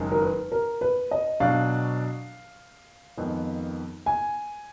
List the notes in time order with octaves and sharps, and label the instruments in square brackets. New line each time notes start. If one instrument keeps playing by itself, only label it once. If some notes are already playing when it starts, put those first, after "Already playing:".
Already playing: [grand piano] F#1 F#2 D#3 G#3
[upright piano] A#4
B4
A#4
B4
D#5
[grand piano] B2 F#3 D4 F#4 [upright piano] F5
[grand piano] F2 D#3 G#3 B3
[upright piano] G#5